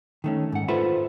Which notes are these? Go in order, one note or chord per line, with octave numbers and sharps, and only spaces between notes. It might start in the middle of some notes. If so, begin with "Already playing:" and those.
D#3 A3 C#4
G#2 F#5
F4 A4 B4 C5 E5